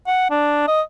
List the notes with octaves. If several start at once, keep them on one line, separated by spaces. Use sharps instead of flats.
F#5
D4
D#5